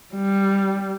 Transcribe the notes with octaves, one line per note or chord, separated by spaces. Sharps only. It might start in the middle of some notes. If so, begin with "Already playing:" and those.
G3